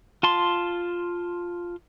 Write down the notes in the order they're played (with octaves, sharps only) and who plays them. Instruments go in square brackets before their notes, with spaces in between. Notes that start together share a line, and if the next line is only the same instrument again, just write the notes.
[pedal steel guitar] F4 A5 C6